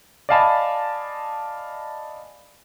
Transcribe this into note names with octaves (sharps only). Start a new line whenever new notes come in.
D5 D#5 F5 G#5 A5 B5